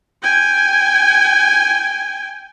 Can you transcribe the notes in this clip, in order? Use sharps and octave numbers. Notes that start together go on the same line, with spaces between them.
G5 G#5